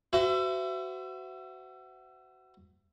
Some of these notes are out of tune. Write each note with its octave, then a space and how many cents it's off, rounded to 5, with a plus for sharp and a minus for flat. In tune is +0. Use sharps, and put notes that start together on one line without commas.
F#4 +20 C5 -45 E5 +30